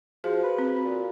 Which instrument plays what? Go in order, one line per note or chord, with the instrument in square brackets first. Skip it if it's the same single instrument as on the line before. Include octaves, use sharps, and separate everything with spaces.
[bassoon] F3 [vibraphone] F#4 [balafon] G#4
[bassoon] B4
[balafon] C4
[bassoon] A#2